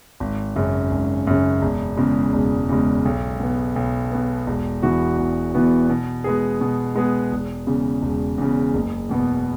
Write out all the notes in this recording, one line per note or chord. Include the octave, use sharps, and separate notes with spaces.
G#1
F#2 C#3
G#1
F#2 C#3
E1
E2 C#3 G#3
E1
E2 C#3 G#3
B1
B2 B3
B1
B2 B3
E1
E2 E3 B3 F#4
E1
E2 E3 B3 F#4
B2
G#3 B3 G#4
B2
G#3 B3 G#4
E1
E2 C#3
E1
E2 C#3
F#1
E2 B2 B3